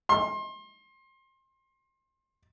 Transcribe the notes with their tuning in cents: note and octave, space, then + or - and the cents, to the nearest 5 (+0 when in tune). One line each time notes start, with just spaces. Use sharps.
C6 +30